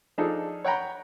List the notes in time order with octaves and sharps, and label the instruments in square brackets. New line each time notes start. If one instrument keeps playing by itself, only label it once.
[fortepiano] F3 D4 D#4 G#4 A4
C#5 F#5 G5 A#5 B5